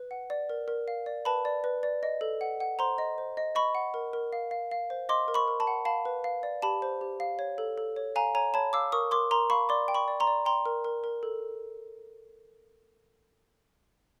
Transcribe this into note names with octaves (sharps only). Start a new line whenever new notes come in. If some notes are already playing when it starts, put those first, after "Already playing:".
Already playing: B4
F#5
D5
A#4
A#4
F5
D5
B4 A5 B5
D5
B4
D5
D#5
A4
F#5
F#5
C5 A#5 C6
D#5
C5
D#5
D#5 B5 C#6
F#5
A#4
A#4
F5
F5
F5
C5
D#5 C6 D6
A#4
B5 C#6
A#4
A5 B5
F#5
F5 A5 B5
B4
F5
D5
G4 A5 B5
C5
G4
F5
C#5
A4
A4
C#5
F5 G#5 A#5
C#5 G#5 A#5
C#5 A5 B5
F5 D6 E6
A#4 C#6 D#6
A#4 C6 D6
A#4 A#5 C6
F5 B5 C#6
D5 C6 D6
G5
B5 C#6
D5
A#5 C6
D5
G5 A#5 C6
A#4
A#4
A#4
A4